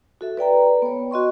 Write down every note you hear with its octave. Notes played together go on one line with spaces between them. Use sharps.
F#4 A4 E5
B4 D5 G5 A#5
B3 C#5
F#4 D#5 C6 C#6